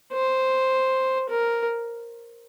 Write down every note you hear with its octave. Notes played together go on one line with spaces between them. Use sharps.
C5
A#4